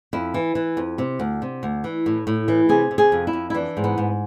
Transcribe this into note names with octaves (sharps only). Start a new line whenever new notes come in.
F2 E4
E3
E3
F2
C3
D2
C3
D2
E3
A2
A2
E3
C3 G#4
C3
G#4
F2
E4
F2
E4
E3 D4
G#2
B3
G#2